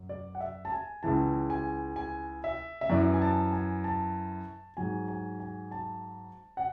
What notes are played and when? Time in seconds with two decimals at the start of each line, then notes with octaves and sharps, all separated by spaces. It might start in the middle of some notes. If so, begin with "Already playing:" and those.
Already playing: F#2
0.09 D5
0.35 F#5
0.40 E5
0.65 A5
0.72 G#5
1.03 C#2 C#3 E3 A5
1.50 G#5
1.96 G#5
2.44 E5
2.81 E5
2.90 F#2 E3 D5
3.14 G#5
3.22 A5
3.53 G#5
3.84 A5
4.77 G#2 F#3 G#5
5.08 G#5
5.40 G#5
5.71 A5
6.57 F#5